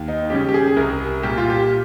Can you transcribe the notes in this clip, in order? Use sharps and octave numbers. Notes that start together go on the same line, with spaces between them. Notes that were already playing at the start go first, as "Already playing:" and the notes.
Already playing: D#2
D#4
C#3 G3 C#4 G4
G4
G#4
G#4
C2 A#4
A#2 G3 G4
F4
G4